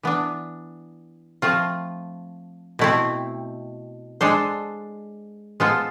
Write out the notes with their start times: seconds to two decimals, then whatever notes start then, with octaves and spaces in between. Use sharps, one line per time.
0.03 E3 B3 D4
1.42 F3 A3 C4 F4
2.79 B2 A3 C4 E4
4.21 G#3 D4 A4 C5
5.60 G#3 B3 F4 A4 C5